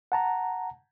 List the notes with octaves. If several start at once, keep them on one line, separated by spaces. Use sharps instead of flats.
F#5 A5 A#5